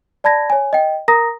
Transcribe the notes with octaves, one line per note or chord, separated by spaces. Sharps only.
D5 A5 B5 G#6 A#6
C#5 G#5
D#5 G5
A#4 A#5 D#6 A#6